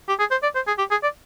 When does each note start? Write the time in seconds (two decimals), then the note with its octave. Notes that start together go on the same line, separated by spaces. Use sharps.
0.08 G4
0.19 G#4
0.31 C5
0.43 D5
0.55 C5
0.67 G#4
0.78 G4
0.91 G#4
1.03 D5